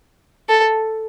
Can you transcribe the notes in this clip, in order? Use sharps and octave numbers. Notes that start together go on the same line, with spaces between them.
A4